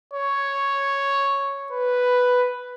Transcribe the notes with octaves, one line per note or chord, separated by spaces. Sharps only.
C#5
B4